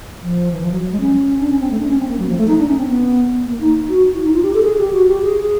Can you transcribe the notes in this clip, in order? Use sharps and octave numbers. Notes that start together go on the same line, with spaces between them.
F3
E3
F3
F#3
F#3
G#3
C#4
D4
C#4
C4
A3
D4
C#4
C4
A#3
F#3
F3
A3
D#4
D4
C#4
C4
B3
A#3
D#4
F#4
E4
D#4
F4
G4
A4
G#4
G4
F#4
G4
G#4
G#4